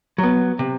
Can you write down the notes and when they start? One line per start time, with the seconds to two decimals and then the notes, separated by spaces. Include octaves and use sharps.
0.18 F#3 B3
0.59 C3